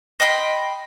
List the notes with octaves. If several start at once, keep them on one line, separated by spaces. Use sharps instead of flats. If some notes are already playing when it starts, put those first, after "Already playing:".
D#5 G5 B5 C6